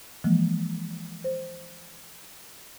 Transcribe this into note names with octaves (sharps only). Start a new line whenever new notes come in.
E3 F3 G#3 A#3
C5